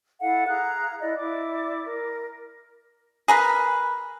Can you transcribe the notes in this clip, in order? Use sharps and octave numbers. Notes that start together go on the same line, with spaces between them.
E4 A4 F5 F#5
G#4 F5 A#5 F#6
E4 D5 D#5
E4 D5 D6
A#4
G#4 A#4 B4